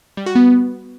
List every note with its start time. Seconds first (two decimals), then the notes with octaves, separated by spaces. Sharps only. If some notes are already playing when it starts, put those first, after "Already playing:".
0.17 G3
0.26 F#4
0.35 B3